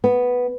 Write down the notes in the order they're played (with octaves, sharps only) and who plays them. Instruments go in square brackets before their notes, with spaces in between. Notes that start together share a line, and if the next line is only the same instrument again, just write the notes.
[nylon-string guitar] B3